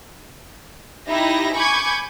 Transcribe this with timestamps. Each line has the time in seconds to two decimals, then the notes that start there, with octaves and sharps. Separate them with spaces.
1.08 D#4 E4 G4 E5 A#6
1.56 G#5 B5 C#6 D6 G6 G#6